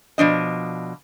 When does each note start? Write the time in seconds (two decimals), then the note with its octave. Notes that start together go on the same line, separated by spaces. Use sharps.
0.18 B2 F3 D4 D#5